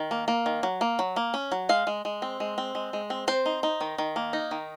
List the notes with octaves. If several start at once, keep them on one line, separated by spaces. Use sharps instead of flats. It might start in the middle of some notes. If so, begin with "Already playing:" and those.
Already playing: D#3
A#3
A#3
D#3
F#3
A#3
F#3
A#3
C#4
F#3
G#3 F5
G#3
G#3
C4
G#3
C4
G#3
G#3
C4
C4 C5
D#4
D#4
D#3
D#3
A#3
D#4
D#3